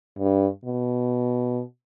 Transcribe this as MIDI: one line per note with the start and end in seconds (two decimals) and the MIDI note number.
0.19 0.47 43
0.65 1.62 47